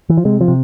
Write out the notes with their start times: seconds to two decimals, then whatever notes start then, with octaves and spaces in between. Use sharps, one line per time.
0.09 E3
0.17 F3
0.25 C3 G#3
0.41 F3
0.48 C3